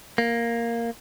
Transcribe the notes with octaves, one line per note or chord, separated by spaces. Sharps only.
A#3